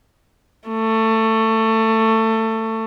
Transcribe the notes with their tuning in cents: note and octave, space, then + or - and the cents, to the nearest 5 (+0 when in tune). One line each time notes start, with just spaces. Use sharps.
A3 +20